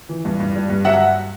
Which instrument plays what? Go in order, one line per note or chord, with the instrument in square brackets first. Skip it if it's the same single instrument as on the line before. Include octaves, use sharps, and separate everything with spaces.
[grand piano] E3
G2
G2
G3
G2
F#3 E5 F#5